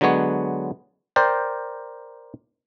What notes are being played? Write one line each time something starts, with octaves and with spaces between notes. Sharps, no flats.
D3 F#3 G#3 B3 C#5
A#4 C5 D5 G5